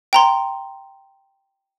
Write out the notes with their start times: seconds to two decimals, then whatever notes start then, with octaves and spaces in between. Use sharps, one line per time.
0.13 G5 A#5 C6